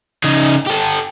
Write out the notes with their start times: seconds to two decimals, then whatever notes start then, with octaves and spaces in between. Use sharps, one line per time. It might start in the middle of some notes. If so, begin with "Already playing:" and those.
0.24 C#3 D#4
0.67 G4 A4